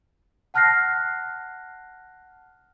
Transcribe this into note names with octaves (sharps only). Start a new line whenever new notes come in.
F#5 A5 F6 F#6 A#6 C7